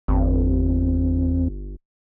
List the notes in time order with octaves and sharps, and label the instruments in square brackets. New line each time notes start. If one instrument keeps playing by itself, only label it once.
[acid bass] G1 [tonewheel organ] E2 C4